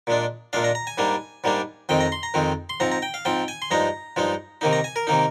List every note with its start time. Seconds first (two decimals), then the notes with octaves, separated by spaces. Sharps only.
0.07 A#2 G#3 D4
0.53 A#2 G#3 D4 F5
0.64 A#5
0.75 A#5
0.87 G#5
0.98 G#2 G3 A#3 D4
1.44 G#2 G3 A#3 D4
1.89 F2 D#3 G#3 C4 G5
2.01 A#5
2.12 C6
2.23 A#5
2.34 F2 D#3 G#3 C4
2.70 C6
2.80 G#2 F3 C4 A#5
2.92 A#5
3.02 G5
3.14 F5
3.25 G#2 F3 C4 G5
3.48 G#5
3.62 C6
3.71 G2 F3 G#3 D#4 A#5
4.16 G2 F3 G#3 D#4
4.61 C3 D#3 A#3 D#4
4.73 A#5
4.84 G#5
4.96 A#4
5.07 C3 D#3 A#3 D#4